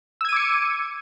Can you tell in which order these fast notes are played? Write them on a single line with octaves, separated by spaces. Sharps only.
E6 G#6 D#7 D6 C#7